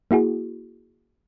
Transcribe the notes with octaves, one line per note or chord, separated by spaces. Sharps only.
A#3 E4 F#4 G#4